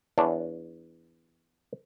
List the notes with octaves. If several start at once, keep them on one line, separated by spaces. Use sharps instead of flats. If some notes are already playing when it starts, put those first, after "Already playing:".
E2 D4 C#5